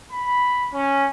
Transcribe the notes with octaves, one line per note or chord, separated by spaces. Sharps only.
B5
C#4